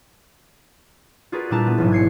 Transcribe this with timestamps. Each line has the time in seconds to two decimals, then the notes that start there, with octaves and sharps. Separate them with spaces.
1.32 F4 F#4 G#4 A#4 B4 D5
1.50 A#2 G3 D4 E4 A5 A#5
1.66 B3
1.78 E1 A1 G#2 F#3
1.92 G#6 C7 C#7